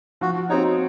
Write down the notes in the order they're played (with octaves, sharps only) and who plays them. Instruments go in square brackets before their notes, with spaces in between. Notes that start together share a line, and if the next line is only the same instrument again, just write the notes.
[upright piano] F3 [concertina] F#4
[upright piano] C4 F#4 C#5 [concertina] D#4